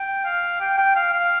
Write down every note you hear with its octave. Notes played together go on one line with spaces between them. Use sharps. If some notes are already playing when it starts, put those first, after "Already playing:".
Already playing: G5
F5
G5
G5
F5
F5